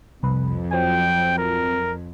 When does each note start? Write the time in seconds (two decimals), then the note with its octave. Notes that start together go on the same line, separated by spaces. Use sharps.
0.23 C2 F2 B4
0.73 F3 F#3 C4 G5
1.38 A#4